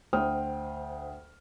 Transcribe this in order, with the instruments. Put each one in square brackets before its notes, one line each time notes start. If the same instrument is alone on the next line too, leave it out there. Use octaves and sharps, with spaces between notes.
[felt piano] D2 C5 G5 D#6 F6